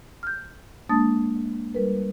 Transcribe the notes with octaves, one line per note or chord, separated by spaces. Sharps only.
F6 G6
G#3 A#3 D4 A5 D#6 A6
G3 A#4 B4